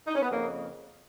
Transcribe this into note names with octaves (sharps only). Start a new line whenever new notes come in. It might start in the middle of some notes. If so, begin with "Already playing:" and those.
D#4
C#4
B3
F2 C#3 A#3